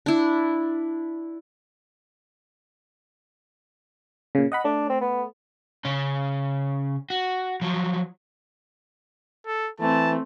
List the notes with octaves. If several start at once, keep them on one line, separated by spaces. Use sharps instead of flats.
D4 E4
A#2 C#3
D#5 F#5 B5
A3 D4
C4
B3
C#3 C#4
F#4
F3 F#3
A4
E3 A3 C4 A5